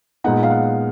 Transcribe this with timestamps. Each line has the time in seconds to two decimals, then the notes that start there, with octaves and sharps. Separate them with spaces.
0.24 A#2 G#3 B3 D#4 F#5
0.43 F5
0.50 F#5